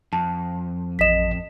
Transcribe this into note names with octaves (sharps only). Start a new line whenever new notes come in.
F2 A5
A1 D#5 B6 E7